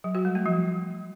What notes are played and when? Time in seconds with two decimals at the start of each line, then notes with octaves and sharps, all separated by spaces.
0.04 F#3
0.15 F#4
0.25 G3
0.35 A3
0.46 F3